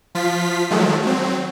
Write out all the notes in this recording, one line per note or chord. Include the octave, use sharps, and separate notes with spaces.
F3 F4 B6
D#3 F3 F#3 G#3 A3
F#3 C4